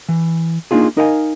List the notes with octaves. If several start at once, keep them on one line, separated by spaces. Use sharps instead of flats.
E3
A#3 D4 D#4 F4 G#4
D#4 A#4 D#5 F5 G5 G#5